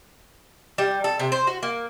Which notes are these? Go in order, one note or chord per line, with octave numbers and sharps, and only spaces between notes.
G3
A4
C3
C5
F#4
A#3